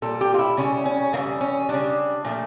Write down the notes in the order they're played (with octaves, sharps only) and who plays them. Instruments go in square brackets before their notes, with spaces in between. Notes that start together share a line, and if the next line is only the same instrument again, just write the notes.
[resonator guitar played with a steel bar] A#2 G3 A4
G4
F4
E4
C#3 G3 C#4
C#4
C#3 E3 G3 A#3
C#4
C#3 G3 D4
A#2 F3 A3